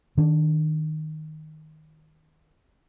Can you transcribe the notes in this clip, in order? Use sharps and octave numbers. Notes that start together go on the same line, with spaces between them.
D#3 D4